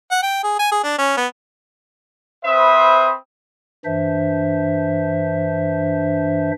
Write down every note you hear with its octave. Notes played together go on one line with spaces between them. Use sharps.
F#5
G5
G#4
G#5
G#4
D4
C#4
B3
C4 B4 C5 E5 B5 D#6
G2 E3 D4 C5 E5